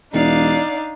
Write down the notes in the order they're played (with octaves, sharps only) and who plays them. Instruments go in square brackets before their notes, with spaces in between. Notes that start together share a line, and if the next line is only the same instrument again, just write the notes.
[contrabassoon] E1 [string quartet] D4 D5 F5 [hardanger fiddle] D#4